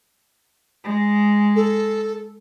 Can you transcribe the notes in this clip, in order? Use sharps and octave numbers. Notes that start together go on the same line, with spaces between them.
G#3
A4